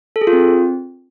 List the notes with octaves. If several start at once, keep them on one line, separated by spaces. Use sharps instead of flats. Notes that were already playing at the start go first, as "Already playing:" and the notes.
A4
G#4
F4
C4